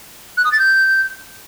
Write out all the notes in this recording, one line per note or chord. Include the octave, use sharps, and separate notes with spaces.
F#6
D#6
A6
G6